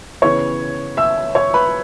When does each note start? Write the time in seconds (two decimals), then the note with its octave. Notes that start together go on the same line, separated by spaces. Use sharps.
0.22 C#3 E3 B3 C#5 C#6
0.97 E5 E6
1.35 C#5 C#6
1.54 B4 B5